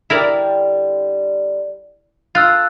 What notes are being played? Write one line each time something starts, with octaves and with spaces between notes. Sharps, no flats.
D3 G3 E4 A#4 D5
F4 A4 E6 F#6 A6